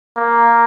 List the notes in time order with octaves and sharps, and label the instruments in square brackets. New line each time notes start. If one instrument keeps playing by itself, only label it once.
[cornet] A#3